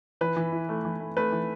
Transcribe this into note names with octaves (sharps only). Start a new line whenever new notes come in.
E3 B4
E3
E4
A3
E3
A3
A3 B4
E3